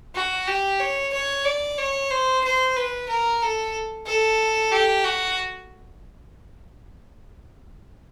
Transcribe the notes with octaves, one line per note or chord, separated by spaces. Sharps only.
F#4
G4
C#5
C#5
D5
C#5
C5
C5
B4
A#4
A4
A4
G4
F#4